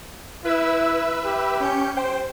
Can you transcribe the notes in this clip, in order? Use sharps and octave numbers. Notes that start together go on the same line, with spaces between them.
E4 B4 E5 E6
G4
C#4 G6 C#7
C5 G5